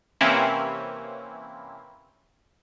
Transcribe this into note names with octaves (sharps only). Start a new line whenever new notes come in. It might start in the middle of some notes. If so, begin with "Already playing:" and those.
C3 E3 A#3 C4 C#4 E4